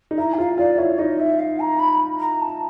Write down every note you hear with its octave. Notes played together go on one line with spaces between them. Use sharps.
D#4
E4 A#5
E5
F4 F5
F4 D5
E4 C#5
D#4 D#5
E5
F5
A#5
B5
A#5
A5